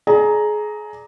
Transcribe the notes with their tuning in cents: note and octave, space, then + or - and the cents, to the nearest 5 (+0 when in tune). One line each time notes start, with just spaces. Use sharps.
G#4 +25 D5 +0 A#5 +0